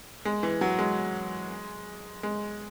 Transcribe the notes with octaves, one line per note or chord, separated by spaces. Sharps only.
G#3
E3
F#3
G#3
G#3